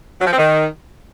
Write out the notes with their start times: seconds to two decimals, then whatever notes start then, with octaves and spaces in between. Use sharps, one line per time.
0.19 F#3
0.25 F3
0.31 C4
0.37 D#3